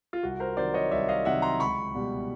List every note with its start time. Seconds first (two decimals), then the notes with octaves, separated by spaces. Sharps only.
0.13 F4
0.23 C2 F#4
0.40 A#4 C5
0.57 C3 D#3 F#3 C5 D5
0.74 C#5 D#5
0.91 C2 D5 E5
1.08 D#5 F5
1.25 C3 D#3 F#3 E5 F#5
1.42 A#5 C6
1.60 C#2 B5 C#6
1.95 B2 G3